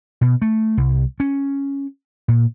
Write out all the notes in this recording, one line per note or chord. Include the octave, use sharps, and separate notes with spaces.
B2
A3
C2
C#4
A#2